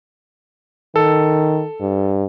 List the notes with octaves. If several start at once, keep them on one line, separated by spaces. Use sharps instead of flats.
D#3 A4
G2